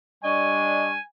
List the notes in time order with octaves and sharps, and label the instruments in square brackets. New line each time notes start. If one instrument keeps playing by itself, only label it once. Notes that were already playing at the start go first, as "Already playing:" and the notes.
[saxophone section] G3 D4 [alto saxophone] D#5 [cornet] G#5 [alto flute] C#6